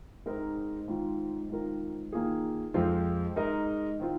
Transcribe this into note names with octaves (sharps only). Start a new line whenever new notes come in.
G#2 G#3 C4 D#4 A#4
G#2 D#3 C4 F4
G#2 D#3 C4 F4 A#4
D#3 A#3 F4 G#4
F2 F3 G#3 C4 F4
G#2 G#3 D#4 A#4 D#5
D#3 C4 F4